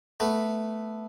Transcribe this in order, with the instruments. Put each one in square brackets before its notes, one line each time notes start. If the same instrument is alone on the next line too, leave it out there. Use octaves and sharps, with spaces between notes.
[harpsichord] A3 B3